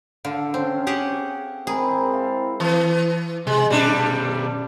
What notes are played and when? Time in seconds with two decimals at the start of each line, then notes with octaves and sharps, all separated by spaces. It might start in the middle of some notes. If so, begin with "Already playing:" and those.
0.25 D3 A4 F5
0.54 C4 C#4
0.87 G4 G#4 F#5
1.67 G#2 C4 G#4 A#4 B5
2.13 E4 F5 A5
2.60 E3
3.47 C3 G#3
3.70 B2 G3 C#4 D4